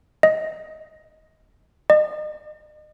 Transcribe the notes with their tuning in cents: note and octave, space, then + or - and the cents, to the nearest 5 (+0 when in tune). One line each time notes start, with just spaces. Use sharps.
D#5 +15
D#5 -35